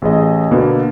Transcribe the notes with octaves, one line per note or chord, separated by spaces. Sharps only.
A1 G#4 D#5
B2 D3 A#3 B3